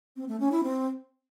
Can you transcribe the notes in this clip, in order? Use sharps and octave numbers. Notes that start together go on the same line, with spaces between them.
C4
A3
C#4
E4
C4